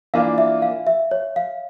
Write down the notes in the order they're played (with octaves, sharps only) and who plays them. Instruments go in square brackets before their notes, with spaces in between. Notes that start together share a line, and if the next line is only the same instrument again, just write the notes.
[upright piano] E3 A#3 D4 F4 [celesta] F5
[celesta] E5
F5
E5
C#5
F5